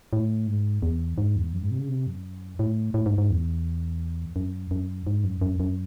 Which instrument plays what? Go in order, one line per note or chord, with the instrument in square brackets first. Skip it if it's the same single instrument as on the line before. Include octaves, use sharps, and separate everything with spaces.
[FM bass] A2
G#2
E2
G#2
E2
F#2
G#2
C3
C#3
C3
F#2
A2
A2
G#2
G#2
E2
F#2
F#2
G#2
F#2
F#2
F#2